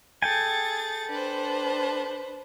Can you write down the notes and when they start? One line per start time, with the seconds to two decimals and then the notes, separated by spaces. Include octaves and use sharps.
0.22 G#4 A4 G5 G#5 A6
1.10 D4 B4 C5